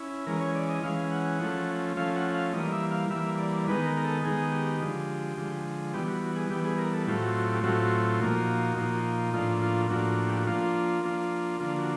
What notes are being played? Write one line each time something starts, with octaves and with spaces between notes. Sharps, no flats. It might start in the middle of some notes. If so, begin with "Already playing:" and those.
Already playing: C#4 E4
E3 G#3 C#4 A#4
C#5
D5
D#5
E3 G#3 C#4 F5
F#5
F3 A3 C#4
F3 A3 C#4 F5
F#5
F5
E3 G3 A#3 D#5
E5
F5
E3 G3 A#3 E5
D5
D#3 G#3 B3 D#4 B4
A#4
A#4
A4
D#3 G#3 B3 D#4 G#4
G4
D3 F3 G#3
D3 F3 G#3
E3 G3 B3 G4
F#4
F#4
G#4
E3 G3 B3 G4
G#4
A#4
A4
A2 F#3 A3 C4 F4 G4
F#4
F#4
G4
A2 F#3 A3 C4 F4 F#4
F#4
A#2 F3 A#3 D#4 F#4
A#2 F3 A#3 D#4
A2 F3 A#3 D4 F4
F4
A2 F3 A#3 D4 F#4
G4
F#4
F3 A#3 D4 F4
F3 A#3 D4 F4
D3 F3 A#3 D4 F4
F#4